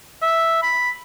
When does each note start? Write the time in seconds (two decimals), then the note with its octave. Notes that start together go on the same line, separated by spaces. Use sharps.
0.23 E5
0.63 B5